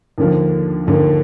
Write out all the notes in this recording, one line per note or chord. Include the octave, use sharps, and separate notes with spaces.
D#2 D3 F3
D#2 D3 F3